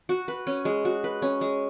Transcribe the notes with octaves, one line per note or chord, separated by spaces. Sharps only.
F#4
B4
C#4
G#3
F#4
B4
C#4
G#3